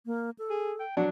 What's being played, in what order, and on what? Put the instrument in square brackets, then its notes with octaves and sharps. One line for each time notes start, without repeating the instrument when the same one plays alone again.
[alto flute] A#3
A4
[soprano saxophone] G#4
G5
[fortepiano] F#3 D4 [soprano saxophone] F#4